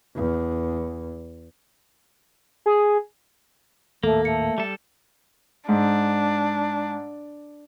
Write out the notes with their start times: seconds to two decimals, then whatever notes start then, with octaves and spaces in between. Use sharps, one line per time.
0.16 E2
2.66 G#4
4.03 D#1 D#2 A2 A3 A#3 A4
4.25 A3 C#7
4.58 G3 A4
5.69 G#2 D4